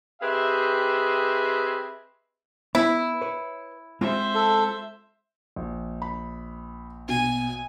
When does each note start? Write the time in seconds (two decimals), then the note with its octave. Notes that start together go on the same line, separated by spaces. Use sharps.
0.21 C4 G4 G#4 B4 D#5 E5
2.75 B3 E4
3.22 B4 C#5
4.01 G#3 C4 F4 C5 E5
4.35 A4
5.56 A#1
6.02 B5
7.09 B2 G#5